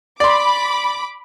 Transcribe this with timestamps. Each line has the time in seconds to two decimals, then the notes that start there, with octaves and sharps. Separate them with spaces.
0.20 D5 B5 C6 D6